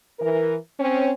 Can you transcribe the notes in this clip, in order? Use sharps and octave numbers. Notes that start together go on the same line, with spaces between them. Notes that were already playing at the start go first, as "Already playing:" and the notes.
E3 A#4
C4 C#4